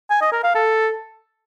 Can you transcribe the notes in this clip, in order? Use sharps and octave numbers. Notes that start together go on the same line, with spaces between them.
G#5
D#5
A#4
F5
A4